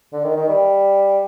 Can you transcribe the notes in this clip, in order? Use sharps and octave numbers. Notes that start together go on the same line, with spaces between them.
D3
D#3
D#3
G3